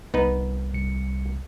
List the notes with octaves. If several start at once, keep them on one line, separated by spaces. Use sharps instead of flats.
C2 B3 D#4 B4
C2 C#7